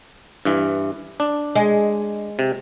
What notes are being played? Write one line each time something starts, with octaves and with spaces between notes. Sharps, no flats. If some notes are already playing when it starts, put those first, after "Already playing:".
G2 E3
D4
G#3
C3